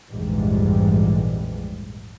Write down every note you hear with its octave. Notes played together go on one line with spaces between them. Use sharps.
A#1 F2 G#2 E3 G3 G#3